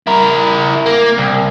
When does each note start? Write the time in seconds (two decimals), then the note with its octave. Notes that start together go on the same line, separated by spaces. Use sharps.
0.07 E4 A#4
0.86 A#3
1.18 C2